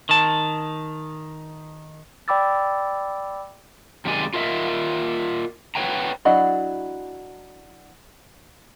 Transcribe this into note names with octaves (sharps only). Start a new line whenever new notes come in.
D#3 A5
D5 G5 B5 D6 E6 A6
F#2 C3 D#3 G#3 D5 G#5
F4 A#4 D#5 E5
B4 C#5 F#5 G5 A#5
F#3 D4 E4 F#4 D#5